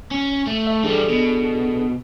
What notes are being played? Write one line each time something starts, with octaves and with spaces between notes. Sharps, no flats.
C#4
A3
E5
E3 G3 D4 G#4 A4
B2